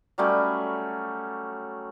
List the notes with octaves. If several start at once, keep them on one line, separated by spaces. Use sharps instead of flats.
F#3 G3 A3 C#4